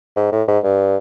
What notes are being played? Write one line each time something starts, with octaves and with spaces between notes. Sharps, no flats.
G#2
A2
G#2
G2